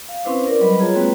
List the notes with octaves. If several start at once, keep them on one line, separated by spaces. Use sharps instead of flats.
F5
C4 C#4 E4 B4 C5 D6
A#4 D5
F#3 G3 B4 D#5 B5
F4 G#4 C#5 A#5
G#3 A#3 C4 F#4 B4 G5